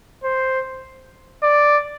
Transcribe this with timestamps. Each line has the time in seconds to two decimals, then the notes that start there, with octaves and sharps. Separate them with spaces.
0.24 C5
1.43 D5